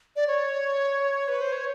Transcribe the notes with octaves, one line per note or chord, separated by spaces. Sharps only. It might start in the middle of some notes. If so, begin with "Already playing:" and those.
D5
C#5
B4
C5
C#5